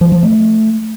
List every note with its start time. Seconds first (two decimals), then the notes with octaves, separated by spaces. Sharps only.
0.01 F3
0.12 F3
0.23 A3